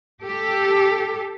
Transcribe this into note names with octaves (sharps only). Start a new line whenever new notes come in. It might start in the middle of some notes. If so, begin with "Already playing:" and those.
G4 A4